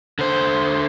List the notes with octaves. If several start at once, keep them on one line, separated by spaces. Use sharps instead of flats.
D3 C5